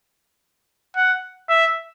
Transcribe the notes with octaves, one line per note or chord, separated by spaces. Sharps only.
F#5
E5